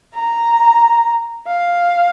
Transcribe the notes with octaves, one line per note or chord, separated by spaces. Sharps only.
A#5
F5